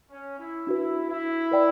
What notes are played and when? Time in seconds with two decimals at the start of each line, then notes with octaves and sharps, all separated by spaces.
0.10 C#4
0.39 E4
0.67 D4 E4 F#4 B4
1.09 E4
1.51 B4 D5 G5 B5